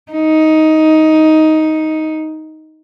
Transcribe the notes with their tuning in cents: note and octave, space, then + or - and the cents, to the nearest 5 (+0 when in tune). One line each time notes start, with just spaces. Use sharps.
D#4 +10